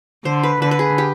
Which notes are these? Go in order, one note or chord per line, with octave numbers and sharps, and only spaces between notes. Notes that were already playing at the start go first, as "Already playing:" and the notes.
D3 C5
B4
D3 B4
B4
G#4
G4